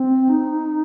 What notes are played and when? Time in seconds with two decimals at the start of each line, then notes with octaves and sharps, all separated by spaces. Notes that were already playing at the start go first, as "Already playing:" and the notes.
Already playing: C4
0.29 D#4